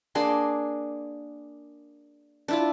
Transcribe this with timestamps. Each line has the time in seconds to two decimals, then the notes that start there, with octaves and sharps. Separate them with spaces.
0.15 A#3 D4 G#4 C6
2.48 D4 E4 F4